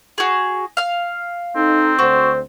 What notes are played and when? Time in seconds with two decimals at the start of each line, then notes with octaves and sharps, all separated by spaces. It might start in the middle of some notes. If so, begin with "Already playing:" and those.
0.18 F#4 G#4
0.77 F5 F6
1.56 C4 D#4 A4
1.99 D2 F#4 C5